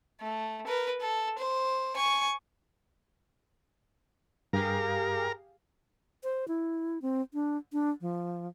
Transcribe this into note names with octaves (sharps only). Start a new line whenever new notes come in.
A3
A#4 B4
A4
C5
G#5 C#6
G2 G4 G#4 A#4 F5
C5
E4
C4
D4
D4
F3